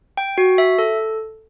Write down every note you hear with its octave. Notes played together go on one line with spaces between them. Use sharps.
G5
F#4
E5
A4